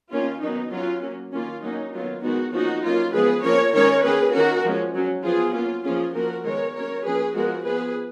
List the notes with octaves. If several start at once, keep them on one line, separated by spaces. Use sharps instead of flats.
D#3 A#3 C#4 F4
D#3 F#3 B3 D#4
F#3 C#4 F4
F#3 A#3 C#4
D#3 A#3 C#4 F4
F#3 A#3 C#4 D#4
D#3 F#3 B3 F4
D#3 G#3 B3 D#4 F#4
F3 A#3 C#4 D#4 F#4
F#3 A#3 C#4 F4
F3 G#3 B3 G#4 B4
F3 A#3 C#4 A#4 C#5
D#3 G#3 C#4 A#4 C#5
D#3 A#3 C#4 G#4 B4
D#3 A#3 C#4 F#4 A#4
F3 G#3 C#4
F#3 C#4
F3 B3 F4 G#4
F#3 A#3 C#4 F4
F3 A#3 C#4 F4 G#4
F3 A#3 C#4 F#4 A#4
D#3 G#3 B3 A#4 C#5
F#3 A#3 C#4 A#4 C#5
F3 A#3 C#4 G#4 B4
F3 G#3 B3 F#4 A#4
F3 B3 G#4 B4